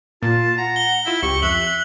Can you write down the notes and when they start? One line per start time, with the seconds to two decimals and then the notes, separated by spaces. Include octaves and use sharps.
0.23 A#2 F4 A5
0.57 F#5 A#5
0.76 G7
1.06 E4 F4 E5 B6
1.23 C#2 G4 C#6
1.42 F2 E5 E6 F#6 F#7